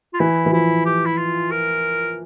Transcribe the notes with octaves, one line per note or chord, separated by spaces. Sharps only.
F4
E3 E4
E3
F3 E4
G4
E4
F4
A#4